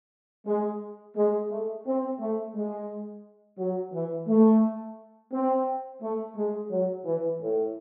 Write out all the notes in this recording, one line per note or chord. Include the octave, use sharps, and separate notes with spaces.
G#3
G#3
A3
C4
A3
G#3
F#3
E3
A3
C4
A3
G#3
F#3
E3
A2